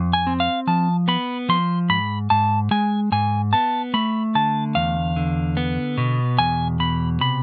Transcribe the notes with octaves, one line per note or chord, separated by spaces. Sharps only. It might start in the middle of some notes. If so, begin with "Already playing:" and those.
Already playing: F2
G#5
C4
F5
F3 A5
B3 B5
F3 C6
G#2 B5
G#2 A5
G#3 G#5
G#2 G#5
B3 A5
A3 B5
D3 A5
E2 F5
D3
B3
B2
E2 G#5
B2 B5
C3 B5